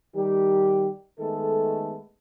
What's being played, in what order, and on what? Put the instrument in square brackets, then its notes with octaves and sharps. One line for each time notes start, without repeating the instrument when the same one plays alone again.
[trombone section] D#3 G3 G4
D#3 G#3 A3 B3 A4